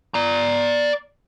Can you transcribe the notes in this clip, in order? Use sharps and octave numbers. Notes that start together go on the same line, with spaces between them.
D5 A#5